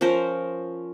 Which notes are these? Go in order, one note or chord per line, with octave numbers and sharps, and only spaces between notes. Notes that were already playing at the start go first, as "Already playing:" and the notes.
F3 C#4 A#4 C5